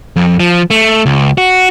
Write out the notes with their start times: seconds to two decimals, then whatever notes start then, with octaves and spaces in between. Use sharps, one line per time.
0.16 F2
0.40 F3
0.70 A3
1.06 C#2
1.38 F#4